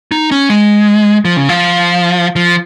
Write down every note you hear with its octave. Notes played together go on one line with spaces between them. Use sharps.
D#4
C#4
G#3
F3
C#3
F3
F3